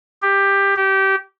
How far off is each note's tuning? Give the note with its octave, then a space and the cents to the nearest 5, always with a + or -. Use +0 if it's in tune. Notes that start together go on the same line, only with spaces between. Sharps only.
G4 +15
G4 -20